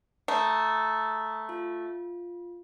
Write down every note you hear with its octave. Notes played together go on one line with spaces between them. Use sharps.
A3 A#5 D#6 G6
F4